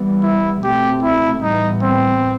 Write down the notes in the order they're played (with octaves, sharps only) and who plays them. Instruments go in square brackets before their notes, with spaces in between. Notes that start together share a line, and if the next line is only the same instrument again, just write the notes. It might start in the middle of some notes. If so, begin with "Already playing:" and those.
Already playing: [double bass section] E3 G3 B3
[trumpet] E4
[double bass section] B2 A3 C4 [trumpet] G4
[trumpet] E4
[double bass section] A2 E3 G3 B3 [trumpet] D#4
[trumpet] C4